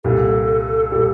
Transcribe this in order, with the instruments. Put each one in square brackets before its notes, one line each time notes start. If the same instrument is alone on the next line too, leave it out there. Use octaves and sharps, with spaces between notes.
[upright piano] C2 A#2 G3 [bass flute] A4
[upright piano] A#2 G3